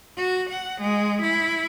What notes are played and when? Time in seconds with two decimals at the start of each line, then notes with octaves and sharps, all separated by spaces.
0.17 F#4
0.50 F#5
0.81 G#3
1.22 E4